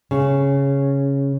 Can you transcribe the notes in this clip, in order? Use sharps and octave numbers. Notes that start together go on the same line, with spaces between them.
C#3